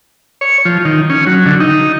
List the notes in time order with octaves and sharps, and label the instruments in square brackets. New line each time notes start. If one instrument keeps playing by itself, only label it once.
[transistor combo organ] C#5
F3
D#3
C#4
F#3
D3
D#4